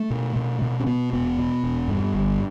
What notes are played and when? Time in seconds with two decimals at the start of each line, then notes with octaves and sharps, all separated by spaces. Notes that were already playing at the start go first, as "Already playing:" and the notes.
Already playing: A3
0.10 B2
0.36 B2
0.62 B2
0.80 C#4
0.86 B2 B3
1.13 E1 B3
1.38 B2
1.64 E1
1.88 G2
2.14 G1